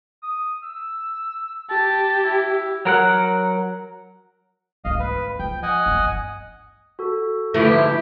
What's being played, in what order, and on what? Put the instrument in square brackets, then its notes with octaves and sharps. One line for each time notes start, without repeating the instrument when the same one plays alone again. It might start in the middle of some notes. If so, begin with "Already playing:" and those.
[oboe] D#6
E6
[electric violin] G4 [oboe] A5
[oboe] E4
[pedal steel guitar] F#3 A#4 F#5
[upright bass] G#1 D2 [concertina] D#5 F5
[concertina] B4
[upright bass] F3 [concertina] G5
[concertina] D#5 F#5 G#5
[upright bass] G1 D#2
[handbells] F#4 A4
[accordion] G#2 E3 E4 [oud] D3 F3 A3 [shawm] G4